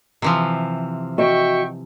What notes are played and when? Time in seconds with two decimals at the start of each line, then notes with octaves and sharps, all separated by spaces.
0.22 C3 E3 F3
1.18 F#4 D#5 E5 G5 C#6